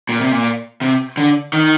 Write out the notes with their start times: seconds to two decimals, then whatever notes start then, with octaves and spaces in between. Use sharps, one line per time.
0.09 A#2
0.20 C3
0.32 A#2
0.81 C3
1.17 D3
1.53 D#3